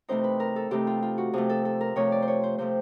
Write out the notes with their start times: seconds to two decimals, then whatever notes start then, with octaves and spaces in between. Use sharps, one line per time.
0.09 C3 E3 A3 C4 D#4 C5
0.24 B4
0.40 A#4
0.56 A4
0.71 C3 E3 A3 C4 D#4 G4
0.87 F4
1.03 F4
1.18 F#4
1.33 C3 F3 A3 G#4
1.49 A4
1.65 A4
1.81 A#4
1.96 C3 F3 A3 C#5
2.12 D5
2.22 C5
2.28 C#5
2.44 C5
2.58 C3 F3 A3 C5